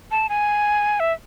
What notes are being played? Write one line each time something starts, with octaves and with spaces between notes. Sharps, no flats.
A5
G#5
E5